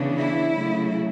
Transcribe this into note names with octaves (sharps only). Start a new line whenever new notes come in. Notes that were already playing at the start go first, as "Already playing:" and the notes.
Already playing: C#3 E3 B3 D4
E4
C#3 F#3 A3